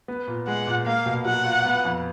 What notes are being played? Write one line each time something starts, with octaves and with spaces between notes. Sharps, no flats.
B3
A#2
G#3 F#5
A#2
A#3 F5
B2
F#3 F#5
F4
B3
F2